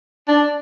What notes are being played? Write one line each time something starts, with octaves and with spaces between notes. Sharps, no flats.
D4